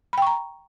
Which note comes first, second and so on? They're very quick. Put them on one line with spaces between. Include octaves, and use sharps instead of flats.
B5 G5 C#6 A#5